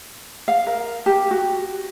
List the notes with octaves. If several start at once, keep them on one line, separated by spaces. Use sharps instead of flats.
F5
A#4
G4
F#4